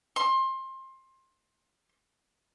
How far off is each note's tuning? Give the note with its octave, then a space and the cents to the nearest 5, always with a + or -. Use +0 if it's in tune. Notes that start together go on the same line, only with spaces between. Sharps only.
C6 +25